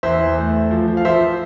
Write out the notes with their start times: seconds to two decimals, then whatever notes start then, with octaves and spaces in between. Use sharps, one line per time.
0.03 E2 C5 E5
0.20 E2
0.37 A3
0.54 A3
0.71 F3
0.88 F3
0.97 F5
1.05 F3 C5 E5